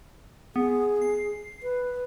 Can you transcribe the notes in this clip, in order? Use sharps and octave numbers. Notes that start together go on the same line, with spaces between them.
B3 G#4
C7
B4